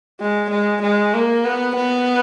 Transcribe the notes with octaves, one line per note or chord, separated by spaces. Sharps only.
G#3
G#3
G#3
A#3
B3
B3